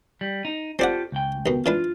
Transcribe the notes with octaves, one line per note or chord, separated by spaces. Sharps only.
G3
D#4
C4 F4 G4 A4 D5 F#5
C#2 G5
D#2 B2
E3 D4 F4 B4